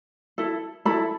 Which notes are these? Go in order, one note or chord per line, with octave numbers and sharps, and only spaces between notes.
E4 A4
E4 A4 B5